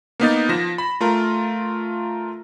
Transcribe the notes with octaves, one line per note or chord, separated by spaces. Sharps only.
A#3 B3 D#4 A6
F3 A#6 E7
B5
A3 F4 A#4